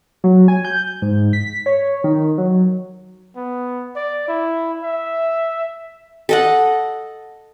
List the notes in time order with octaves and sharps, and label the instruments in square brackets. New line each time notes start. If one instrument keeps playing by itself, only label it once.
[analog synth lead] F#3
G#5
G6
G#2
B6
C#5
D#3
F#3
[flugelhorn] B3
D5
E4
E5
[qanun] A4 D#5 F#5